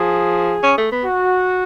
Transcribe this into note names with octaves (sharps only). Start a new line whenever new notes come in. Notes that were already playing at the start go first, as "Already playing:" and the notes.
Already playing: F3 G#4
C#4
A3
B3
F#4